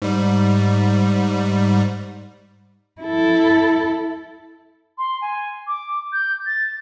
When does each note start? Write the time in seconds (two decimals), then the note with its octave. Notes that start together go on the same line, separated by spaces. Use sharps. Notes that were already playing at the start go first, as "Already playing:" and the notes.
0.02 G#2 G3
3.01 E4 A4
4.98 C6
5.21 G#5
5.67 D6
6.13 G6
6.46 A6